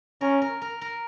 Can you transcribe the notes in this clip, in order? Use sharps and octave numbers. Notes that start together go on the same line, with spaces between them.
C#4 A#4
A#4
A#4
A#4